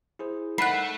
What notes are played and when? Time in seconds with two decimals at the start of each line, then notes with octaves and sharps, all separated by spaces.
0.19 E4 G#4 C5
0.58 A3 D#4 A#4 F#5 B5 F#6 C7